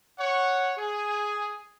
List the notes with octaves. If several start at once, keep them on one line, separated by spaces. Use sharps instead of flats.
C#5 F#5
G#4